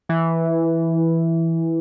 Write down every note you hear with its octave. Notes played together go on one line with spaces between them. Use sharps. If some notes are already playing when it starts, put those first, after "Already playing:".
E3